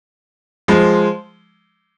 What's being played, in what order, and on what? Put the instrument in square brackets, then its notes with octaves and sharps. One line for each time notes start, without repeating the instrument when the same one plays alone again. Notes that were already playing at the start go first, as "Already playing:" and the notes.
[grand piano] F3 G#3